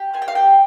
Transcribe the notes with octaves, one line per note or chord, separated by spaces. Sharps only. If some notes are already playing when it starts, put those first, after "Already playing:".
Already playing: G4
C4 G#5
G5
F5
G4 G5